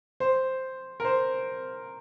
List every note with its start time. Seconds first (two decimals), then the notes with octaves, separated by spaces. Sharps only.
0.20 C5
1.00 A#4
1.05 C5